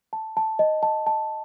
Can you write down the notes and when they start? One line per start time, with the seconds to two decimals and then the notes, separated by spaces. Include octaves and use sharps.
0.13 A5
0.37 A5
0.59 D#5
0.83 A5
1.07 A5